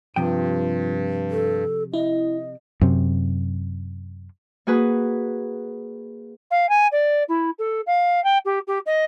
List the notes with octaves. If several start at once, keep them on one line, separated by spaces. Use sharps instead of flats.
G2 C3 F3 F4 G5
A4
E4 D#5
F#2 C3
A#3 F#4 G#4 B4
F5
G#5
D5
E4
A4
F5
G5
G4
G4
D#5